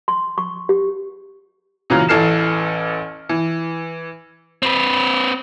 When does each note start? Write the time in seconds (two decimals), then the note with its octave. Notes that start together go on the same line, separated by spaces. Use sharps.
0.08 C6
0.38 C#6
0.69 G4
1.90 A#2 C#3 E3 F#3 F4 A#5
2.08 A1 E3 A4 F6 C7 E7
3.29 E3
4.63 C4 B4